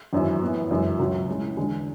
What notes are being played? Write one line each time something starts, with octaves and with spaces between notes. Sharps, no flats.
G#1 F#2 E3
A2 E3 B3
F#1 F#2 E3 G#3
C#2 B2 F#3
A2 G#3 C#4
E2 D3 G#3